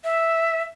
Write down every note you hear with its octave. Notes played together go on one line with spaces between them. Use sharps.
E5